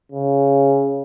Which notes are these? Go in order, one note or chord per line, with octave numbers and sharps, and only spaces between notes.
C#3